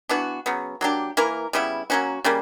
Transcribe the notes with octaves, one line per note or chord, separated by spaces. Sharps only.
E3 B3 D4 F#4
C#3 F#3 B3
F#3 A#3 D4 G4
E3 A#3 E4 A#4
C#3 G3 B3 E4
F#3 A#3 C#4 F#4
C#3 G3 A#3